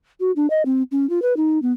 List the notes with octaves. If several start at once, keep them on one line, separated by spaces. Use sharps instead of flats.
F#4
D4
D#5
C4
C#4
F4
B4
D#4
B3